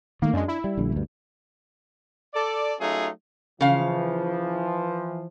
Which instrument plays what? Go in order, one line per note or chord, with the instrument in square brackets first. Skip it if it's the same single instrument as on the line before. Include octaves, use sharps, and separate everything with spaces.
[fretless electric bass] D#3 A3 [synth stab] A#3
[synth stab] F#2 G#3 [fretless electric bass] D4
[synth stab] E4
[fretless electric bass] G3
A#1 D3 G3
D2 G2
[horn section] A4 D5
F#3 A3 C#4 D#4 F4 G#4
[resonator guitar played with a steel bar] C#3 F5 [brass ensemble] E3 F3